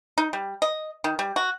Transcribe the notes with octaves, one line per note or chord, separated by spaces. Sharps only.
D#4
G3
D#5
D#3
G3
F#4